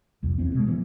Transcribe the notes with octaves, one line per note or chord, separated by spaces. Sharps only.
C2 F2
F1 E2 C4
B2 E3 G#3
A2 E3 F#3 B3